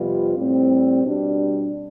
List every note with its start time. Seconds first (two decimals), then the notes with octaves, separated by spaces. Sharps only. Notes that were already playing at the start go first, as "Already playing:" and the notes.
Already playing: F2 C3 G3 B3 F4
0.36 A2 G3 C4
1.03 B2 G3 D4